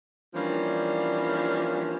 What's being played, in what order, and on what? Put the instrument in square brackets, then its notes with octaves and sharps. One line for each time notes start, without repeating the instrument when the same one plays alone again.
[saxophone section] E3 F3 G3 A#3 C#4 D4